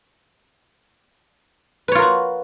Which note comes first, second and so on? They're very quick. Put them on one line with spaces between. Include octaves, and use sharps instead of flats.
B4 C#5 F4 A#4 F#4